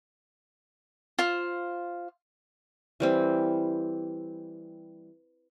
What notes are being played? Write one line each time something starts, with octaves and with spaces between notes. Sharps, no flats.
F4 C5
E3 G3 C4